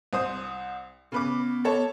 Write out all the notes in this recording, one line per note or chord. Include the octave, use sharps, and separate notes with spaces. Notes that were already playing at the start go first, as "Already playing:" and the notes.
C2 C5 D#6
C#3 B3 B4 D6
A4 C#5 A5